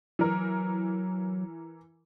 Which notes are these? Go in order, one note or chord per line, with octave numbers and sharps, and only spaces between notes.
E3 F#3 A#4